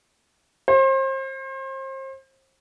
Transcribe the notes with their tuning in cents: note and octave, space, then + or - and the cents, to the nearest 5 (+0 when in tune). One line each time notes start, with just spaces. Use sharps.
C5 +35